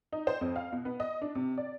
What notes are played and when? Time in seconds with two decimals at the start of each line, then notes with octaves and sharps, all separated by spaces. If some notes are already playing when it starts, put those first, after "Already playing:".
0.12 D#4
0.27 C5
0.41 F2
0.56 F5
0.72 B2
0.85 B3
1.00 D#5
1.22 D4
1.35 C3
1.58 D5